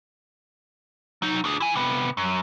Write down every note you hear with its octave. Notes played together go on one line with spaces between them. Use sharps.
F#3 D#4
D4 G#4
E4 G#5
C3 B3
F#2